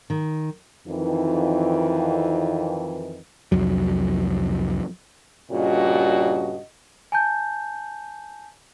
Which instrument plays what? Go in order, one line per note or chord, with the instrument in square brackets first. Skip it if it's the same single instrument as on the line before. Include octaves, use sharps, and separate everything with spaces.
[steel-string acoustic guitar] D#3
[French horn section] F2 D#3 E3
[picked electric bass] C2 F2 F#3
[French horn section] G2 A#2 C#3 F#4 D#5
[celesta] G#5 A5 G6